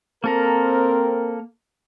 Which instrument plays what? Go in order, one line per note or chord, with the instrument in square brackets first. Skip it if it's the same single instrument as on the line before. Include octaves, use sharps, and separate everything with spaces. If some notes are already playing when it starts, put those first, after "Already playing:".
[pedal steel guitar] A#3 A4 A#5 [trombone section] C4 A#4